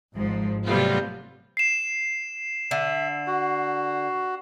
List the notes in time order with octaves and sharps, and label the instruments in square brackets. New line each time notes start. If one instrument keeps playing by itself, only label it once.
[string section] G#1 G#2 F3
C3 F#3 G3 A3 B3 F4
[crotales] C7 E7
[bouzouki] D3 [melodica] E5
[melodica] F#4